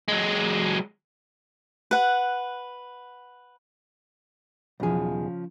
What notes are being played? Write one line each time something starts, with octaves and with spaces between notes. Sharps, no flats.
F#3 G#3
B4 F#5
B1 E2 C#3 F3 G#4